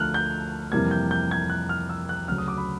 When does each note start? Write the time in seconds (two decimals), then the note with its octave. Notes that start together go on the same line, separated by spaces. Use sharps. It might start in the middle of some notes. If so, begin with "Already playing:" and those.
Already playing: D2 D3 F3 A3 F6 F#6
0.14 G6
0.72 F2 C3 E3 G3 A#3 G#6
0.91 G6
1.11 G6
1.31 G#6
1.50 F#6
1.69 F6
1.89 E6
2.09 F#6
2.28 D2 C#3 F#3 F6
2.38 D#6
2.48 D6
2.58 B5